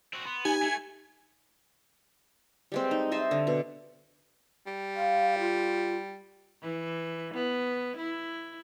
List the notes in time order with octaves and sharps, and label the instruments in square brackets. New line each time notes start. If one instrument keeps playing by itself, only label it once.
[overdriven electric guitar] C4 F#4
[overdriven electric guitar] B3 [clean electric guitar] C6
[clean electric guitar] D#4 G4 [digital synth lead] G#5
[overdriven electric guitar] A3
[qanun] G3 G#3 C4
D#4
C5 D#5 E5 A5
D3
B2
[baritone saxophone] G3
[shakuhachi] F5
F4
[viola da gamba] E3
B3
E4